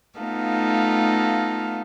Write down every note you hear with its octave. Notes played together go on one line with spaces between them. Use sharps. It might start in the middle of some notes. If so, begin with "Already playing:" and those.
A3 B3 D#4 F4 A4 F5